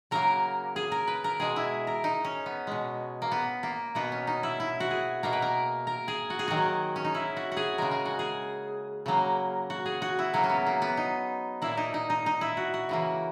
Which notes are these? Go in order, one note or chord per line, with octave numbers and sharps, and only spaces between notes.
C#3 F#3 A#3 A#4
G#4
A#4
B4
A#4
B2 G#3 G#4
E4
A#4
D#4
C#4
B3
B2 G#3
A#3
B3
A#3
B2 A#3 B3
C#4
D#4
E4
E4
F#4
G#4
B2 A#3 A#4
B4
A#4
A#4
G#4
F#4
G#4
D#3 F#3 A#3 F#4
C#4
D#4
E4
F#4
F#4
G#4
C#3 G#3 A#4
G#4
F#4
G#4
C#3 F#3 A#3
F#4
G#4
F#4
E4
C#3 F#3 A#3 C#4
C#4
B3
A#3
B3
D#4
A#2 A#3 E4
D#4
D#4
D#4
D#4
E4
F#4
F#4
C#3 E3 A#3